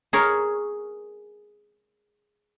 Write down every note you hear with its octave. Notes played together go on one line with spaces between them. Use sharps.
G#4 A#4 C#5